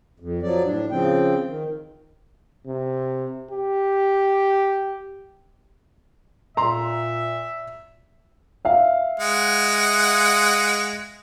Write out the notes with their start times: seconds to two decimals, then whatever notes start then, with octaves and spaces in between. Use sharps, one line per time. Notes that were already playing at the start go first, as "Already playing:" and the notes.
0.20 F2
0.43 F3 F#3 D5
0.65 A2 D4
0.91 C#3 F3 C4 G5
1.48 D#3
2.67 C3
3.51 G4
6.57 A#2 E5 A#5 C6
8.65 E5 F5
9.20 G#3 F#5